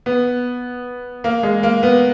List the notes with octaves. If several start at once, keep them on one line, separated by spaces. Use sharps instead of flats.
B3
A#3
G#3
A#3
B3